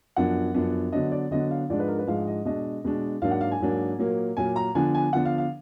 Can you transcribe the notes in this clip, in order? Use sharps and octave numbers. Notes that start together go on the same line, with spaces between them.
F#2 F3 B3 D4 F#5
F#2 F3 B3 D4
D3 F#3 B3 D4 D#5
D5
D3 F#3 B3 D4 D#5
F5
G#2 F3 G#3 D4 D5
B4
A#4
B4
G#2 F3 G#3 D4 F5
D#5
B2 G#3 D4 D#5
B2 G#3 D4
G#2 F#3 A#3 D4 F5
F#5
F5
G#5
G#2 F#3 A#3 D4
A#2 F#3 A#3
A#2 F#3 A#3 G#5
A#5
D3 F3 B3 D4 G#5
G#5
D3 F3 B3 D4 F#5
F5
F5